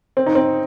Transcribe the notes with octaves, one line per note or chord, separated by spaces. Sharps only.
C4
D#4
C4